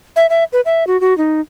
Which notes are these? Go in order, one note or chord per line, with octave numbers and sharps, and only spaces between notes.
E5
E5
B4
E5
F#4
F#4
D#4